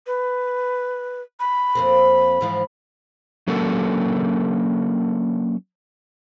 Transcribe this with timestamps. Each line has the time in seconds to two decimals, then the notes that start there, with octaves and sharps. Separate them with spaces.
0.07 B4
1.40 B5
1.75 F2 A#3 C4
2.41 G#2 E3 F3
3.47 F#3 A#3 C#4 D4 A4 A#4